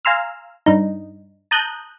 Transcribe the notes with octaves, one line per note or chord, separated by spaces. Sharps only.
F5 G#5 A#5 C6 E6 F6
G2 D#4
A5 A#5 D#6 F#6 G6